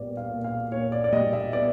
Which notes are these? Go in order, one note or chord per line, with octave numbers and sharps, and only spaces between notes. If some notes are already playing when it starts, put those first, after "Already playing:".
Already playing: A#2 G3 B3 D5
F5
A#2
F5
A#2 C#5
D5
D5
G3 D#5
E5
B3 D5